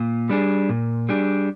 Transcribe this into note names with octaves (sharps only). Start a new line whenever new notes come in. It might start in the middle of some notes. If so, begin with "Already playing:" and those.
Already playing: A#2
G3 D4 G#4
A#2
G3 D4 G#4